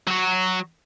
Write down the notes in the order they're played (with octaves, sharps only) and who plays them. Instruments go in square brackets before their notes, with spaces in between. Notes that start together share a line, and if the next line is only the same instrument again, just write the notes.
[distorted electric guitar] F#3 F#4